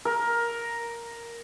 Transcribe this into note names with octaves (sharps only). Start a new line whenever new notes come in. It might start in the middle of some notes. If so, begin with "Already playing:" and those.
A#4